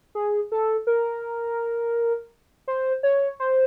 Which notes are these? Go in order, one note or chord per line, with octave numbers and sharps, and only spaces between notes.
G#4
A4
A#4
C5
C#5
C5